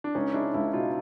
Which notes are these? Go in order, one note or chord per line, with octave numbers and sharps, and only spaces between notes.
D4
C#2 C#4 D#4
G#3 D4 E4
C#2 D4 E4
B2 D#4 F4